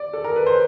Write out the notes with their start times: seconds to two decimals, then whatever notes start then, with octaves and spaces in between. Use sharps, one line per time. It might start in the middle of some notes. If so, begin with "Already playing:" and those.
Already playing: D5
0.13 A4
0.24 A#4
0.36 B4
0.46 C5